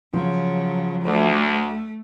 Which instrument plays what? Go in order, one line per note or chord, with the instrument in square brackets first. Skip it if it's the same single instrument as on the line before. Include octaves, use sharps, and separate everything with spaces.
[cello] C#3 [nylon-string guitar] F3 [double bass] F#3
[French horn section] D2 [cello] A3